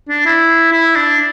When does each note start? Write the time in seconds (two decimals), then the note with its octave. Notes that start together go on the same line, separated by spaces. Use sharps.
0.09 D4
0.26 E4
0.72 E4
0.96 D4